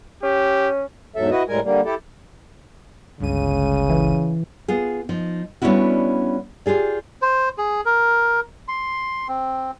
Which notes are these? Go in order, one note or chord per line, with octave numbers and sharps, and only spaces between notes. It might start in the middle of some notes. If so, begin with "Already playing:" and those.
C#4 G4
E2 G#2 F#3 A4 E5
E4 F#4 B4 D#5
A2 G3 G#3 A#4 G#5
D3 G3 A#3
E4 G4 A4
G1 C#2 C#3 D#7
E3
B3 F4 G#4
F3 D#4
G3 B3 C#4 D4 E4 F#4
F4 G4 G#4 D5
C5
G#4
A#4
C6
C4